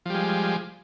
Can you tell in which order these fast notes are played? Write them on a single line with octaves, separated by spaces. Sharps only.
F3 G3 G#3